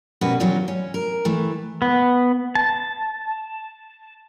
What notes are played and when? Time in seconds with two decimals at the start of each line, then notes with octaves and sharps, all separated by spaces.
0.21 B2 G3 C#4 F#4 A#4 B4
0.40 E3 F#3 G3 B3 C4 F4
0.68 C#4
0.94 A#4
1.25 E3 A3
1.82 B3
2.55 A5